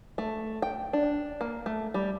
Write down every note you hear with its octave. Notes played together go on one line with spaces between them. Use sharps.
A3
G5
D4
A#3
A3
G3